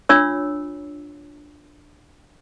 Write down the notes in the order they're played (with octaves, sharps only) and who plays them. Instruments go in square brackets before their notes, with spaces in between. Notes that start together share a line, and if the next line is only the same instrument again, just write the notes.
[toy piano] D4 F4 C#5 E6